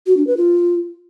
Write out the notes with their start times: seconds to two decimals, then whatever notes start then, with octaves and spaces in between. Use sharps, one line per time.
0.07 F#4
0.17 D4
0.27 B4
0.37 F4